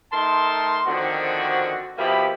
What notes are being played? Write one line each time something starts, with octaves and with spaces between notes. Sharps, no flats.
A3 D#4 A#4 A5 C6
D3 D#3 F3 C4 F#4
B2 F3 A#3 G4 E5 B5